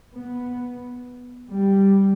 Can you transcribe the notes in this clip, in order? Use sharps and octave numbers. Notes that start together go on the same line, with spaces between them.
B3
G3